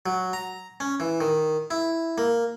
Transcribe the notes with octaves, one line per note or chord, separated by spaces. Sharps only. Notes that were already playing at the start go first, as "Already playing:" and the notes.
F#3
A#5
C#4
E3
D#3
E4
A#3